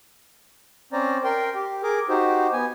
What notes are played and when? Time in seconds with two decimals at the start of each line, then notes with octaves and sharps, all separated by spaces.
0.93 C4 C#4 C5 D5 A#5
1.24 A#4 G5 C6
1.55 G4
1.83 G#4 A#4 D6
2.09 D#4 F#4 G4 C5
2.53 B3 G#5